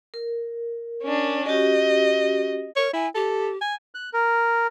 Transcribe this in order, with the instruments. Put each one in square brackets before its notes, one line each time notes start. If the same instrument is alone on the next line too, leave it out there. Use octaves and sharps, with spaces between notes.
[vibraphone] A#4
[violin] C#4 D4
[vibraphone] C#4 F#4 G4 [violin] D#5
[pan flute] A#4 [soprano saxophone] C#5
[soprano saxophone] E4 [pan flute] G#5
[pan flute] G4 [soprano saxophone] A4
[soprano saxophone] G#5
[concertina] F#6
A#4